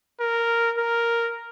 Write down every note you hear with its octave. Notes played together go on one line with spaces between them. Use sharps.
A#4
A#4